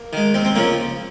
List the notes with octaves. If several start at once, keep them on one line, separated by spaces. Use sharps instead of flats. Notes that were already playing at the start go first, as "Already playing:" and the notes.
Already playing: A#3
D#3 G#3
D#2 C4
C4
C#3 F3 A#3